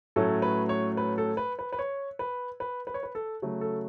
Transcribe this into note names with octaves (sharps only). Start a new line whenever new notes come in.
A2 F#3 A3 C#4 A4
B4
C#5
B4
A4
B4
B4
B4
C#5
B4
B4
B4
C#5
B4
A4
C#3 F#3 A3
A4